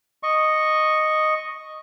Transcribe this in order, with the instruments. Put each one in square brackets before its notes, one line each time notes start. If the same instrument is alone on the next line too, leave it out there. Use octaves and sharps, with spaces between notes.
[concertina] D#5 C#6